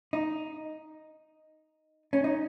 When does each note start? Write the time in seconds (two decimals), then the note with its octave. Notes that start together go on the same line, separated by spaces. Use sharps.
0.13 D#4
2.13 C#4
2.24 D#4